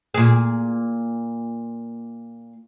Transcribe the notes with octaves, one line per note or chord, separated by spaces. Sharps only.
A#2 G#4